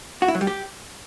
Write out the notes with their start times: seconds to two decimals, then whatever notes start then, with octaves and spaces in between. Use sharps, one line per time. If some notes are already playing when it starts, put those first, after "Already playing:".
0.22 F#4
0.28 E4
0.35 F#3
0.41 G3
0.47 G4